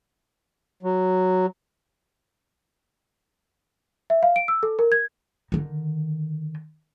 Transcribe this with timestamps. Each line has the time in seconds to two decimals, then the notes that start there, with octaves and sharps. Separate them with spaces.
0.83 F#3
4.10 E5
4.23 F5
4.36 D7
4.48 E6
4.63 A4
4.79 A#4
4.92 G#6
5.52 D3 D#3